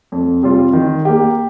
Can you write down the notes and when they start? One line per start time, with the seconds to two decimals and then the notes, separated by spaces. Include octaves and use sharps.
0.12 F2
0.43 C3 G3 C4 F4
0.73 D#3
1.05 A#3 G4